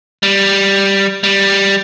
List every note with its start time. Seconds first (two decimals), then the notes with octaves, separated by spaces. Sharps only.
0.23 G3
1.23 G3